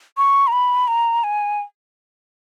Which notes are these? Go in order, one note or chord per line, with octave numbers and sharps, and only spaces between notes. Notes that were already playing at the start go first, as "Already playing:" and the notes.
C#6
A#5
B5
A#5
G#5